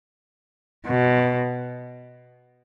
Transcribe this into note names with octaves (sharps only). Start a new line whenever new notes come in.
B2